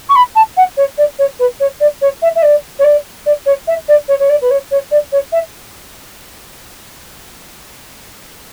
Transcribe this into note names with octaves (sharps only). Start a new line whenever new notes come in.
C#6
B5
A5
F#5
C#5
D5
C#5
B4
C#5
D5
C#5
E5
E5
D5
C#5
D5
D5
C#5
E5
D5
C#5
C#5
D5
B4
C#5
C#5
D5
C#5
E5